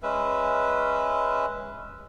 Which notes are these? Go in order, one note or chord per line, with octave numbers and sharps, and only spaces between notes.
G#3 C#4 B4 E5